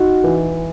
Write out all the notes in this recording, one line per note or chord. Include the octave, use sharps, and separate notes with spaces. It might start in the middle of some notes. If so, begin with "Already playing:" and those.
Already playing: D#4 F#4
E3